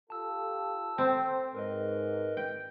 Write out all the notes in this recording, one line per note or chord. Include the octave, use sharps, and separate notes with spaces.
F4 G4 A4 A5 E6
C4 A4 C5 G5
G#2 A#4 B4 D#5
G5